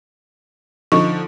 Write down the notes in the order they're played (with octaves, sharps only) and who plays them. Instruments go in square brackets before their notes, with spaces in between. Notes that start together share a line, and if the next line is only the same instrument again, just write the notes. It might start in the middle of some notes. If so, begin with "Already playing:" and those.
[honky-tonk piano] D3 F3 D#4 [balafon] C#6